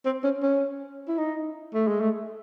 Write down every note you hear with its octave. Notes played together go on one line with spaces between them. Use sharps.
C4
C#4
C#4
E4
D#4
A3
G#3
A3